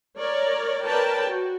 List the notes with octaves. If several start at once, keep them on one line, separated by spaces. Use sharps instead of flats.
A#4 C#5 D5
A#4 B4 C#5 D5 G5 A5
F#4